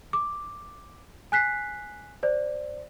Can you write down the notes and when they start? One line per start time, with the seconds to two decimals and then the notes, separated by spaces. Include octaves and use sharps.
0.13 D6
1.32 G#5 F#6 B6 C7
2.23 C5 D5